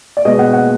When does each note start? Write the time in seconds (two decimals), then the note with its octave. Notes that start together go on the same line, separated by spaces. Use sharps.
0.17 D5
0.25 B2 G#3 B3 D#5
0.39 F#5
0.53 F#5